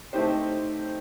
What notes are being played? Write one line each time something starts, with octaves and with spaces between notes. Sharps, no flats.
A3 C4 D#4 G4 C5